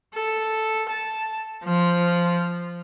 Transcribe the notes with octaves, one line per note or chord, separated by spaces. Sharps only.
A4
A5
F3